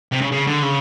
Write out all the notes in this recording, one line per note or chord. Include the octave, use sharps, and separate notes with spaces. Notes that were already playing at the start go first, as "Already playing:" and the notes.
C3
C#3
C#3
D3
C#3